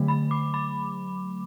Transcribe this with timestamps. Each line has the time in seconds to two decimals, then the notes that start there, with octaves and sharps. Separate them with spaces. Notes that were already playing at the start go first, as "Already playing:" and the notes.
Already playing: D3 F#3 A3
0.08 B5
0.31 D6
0.54 B5